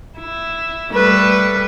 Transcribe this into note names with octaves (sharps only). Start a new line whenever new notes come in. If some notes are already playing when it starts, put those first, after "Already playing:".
E4
G3 A3 B4